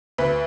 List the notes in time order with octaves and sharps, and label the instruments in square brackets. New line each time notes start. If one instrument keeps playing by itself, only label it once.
[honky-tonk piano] D2 B4